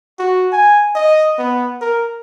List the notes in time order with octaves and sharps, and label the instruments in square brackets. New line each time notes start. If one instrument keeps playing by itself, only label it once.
[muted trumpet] F#4
G#5
D#5
B3
A#4